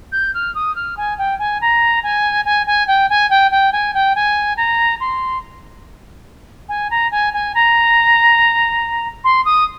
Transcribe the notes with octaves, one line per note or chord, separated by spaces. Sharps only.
G6
F6
D#6
F6
G#5
G5
G#5
A#5
G#5
G#5
G#5
G5
G#5
G5
G5
G#5
G5
G#5
A#5
C6
G#5
A#5
G#5
G#5
A#5
C6
D#6